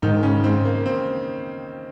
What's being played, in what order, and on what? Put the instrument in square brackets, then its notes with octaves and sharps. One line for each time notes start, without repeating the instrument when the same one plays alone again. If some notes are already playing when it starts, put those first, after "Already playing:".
[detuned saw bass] G#2 [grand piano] D#3 D#4
[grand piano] C#3 C#4
C4
A#3
C4